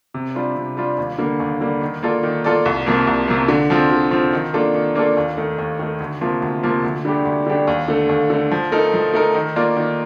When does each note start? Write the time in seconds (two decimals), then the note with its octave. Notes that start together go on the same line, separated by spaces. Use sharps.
0.14 C3
0.35 G3 D4 F4
0.56 C3
0.77 G3 D4 F4
0.98 D#2
1.18 D3 G3 A#3
1.40 D#2
1.61 D3 G3 A#3
1.81 D#3
2.03 A#3 F4 A4 D5
2.23 D#3
2.44 A#3 F4 A4 D5
2.66 C2
2.86 C3 F3 A#3
3.07 C2
3.28 C3 F3 A#3
3.48 D3
3.70 F3 C4 F4
3.91 D3
4.11 F3 C4 F4
4.33 D#3
4.54 A#3 D4 F4 A4
4.74 D#3
4.95 A#3 D4 F4 A4
5.17 D#2
5.37 D#3 A3
5.58 D#2
5.79 D#3 A3
6.00 D2
6.21 C3 F3 A#3 F4
6.42 D2
6.63 C3 F3 A#3 F4
6.84 D2
7.05 D3 G3 D4 G4
7.25 D2
7.46 D3 G3 D4 G4
7.67 D#2
7.88 D3 A3
8.09 D#2
8.30 D3 A3
8.51 F3
8.72 A3 D#4 A#4
8.94 F3
9.14 A3 D#4 A#4
9.35 D#3
9.56 A#3 F4 A#4 D5
9.77 D#3